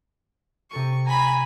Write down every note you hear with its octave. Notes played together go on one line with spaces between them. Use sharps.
C3 A4 C#6 D#7
G#5 A#5 B5